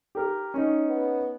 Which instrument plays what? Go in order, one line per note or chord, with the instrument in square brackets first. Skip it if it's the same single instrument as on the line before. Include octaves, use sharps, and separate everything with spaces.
[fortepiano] G4 A#4
C#4 D#4
[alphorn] B3